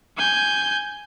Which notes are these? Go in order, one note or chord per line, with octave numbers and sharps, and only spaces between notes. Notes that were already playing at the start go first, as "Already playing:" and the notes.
G#5 G6